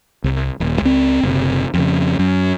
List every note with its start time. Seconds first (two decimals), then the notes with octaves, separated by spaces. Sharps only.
0.24 C2
0.60 D#1
0.81 C#2 C4
1.23 F#1 C3
1.74 F2 C#3
2.19 F#2